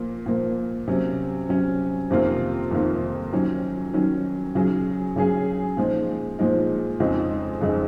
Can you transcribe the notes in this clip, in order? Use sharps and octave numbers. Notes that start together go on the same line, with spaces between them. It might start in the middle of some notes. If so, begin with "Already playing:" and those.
Already playing: A#2 F3 A#3
A#2 F3 A#3
C3 F#3 C#4
C3 F#3 C#4
F2 C3 D#3 A#3 F4
F2 C3 D#3 A#3 F4
D#3 F#3 C#4
D#3 F#3 C#4
C#3 F#3 C#4 G#4
C#3 F#3 C#4 G#4
A#2 F3 G#3 D#4
A#2 F3 G#3 D#4
F2 C#3 G#3 C4 D#4
F2 C#3 G#3 C4 D#4